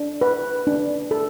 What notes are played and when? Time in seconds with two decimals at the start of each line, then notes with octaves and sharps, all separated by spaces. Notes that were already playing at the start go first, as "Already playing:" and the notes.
Already playing: D4
0.21 B4
0.67 D4
1.11 A4